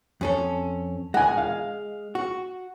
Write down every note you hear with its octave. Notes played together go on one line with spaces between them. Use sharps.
F2 C#4 A4
G#3 F#5 G#5
F5
F#4